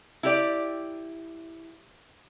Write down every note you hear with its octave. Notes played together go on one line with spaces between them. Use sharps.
E4 G4 D5